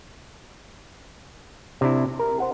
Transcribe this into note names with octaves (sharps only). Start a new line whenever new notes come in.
C3 D4 E4
A#4
C5 F#5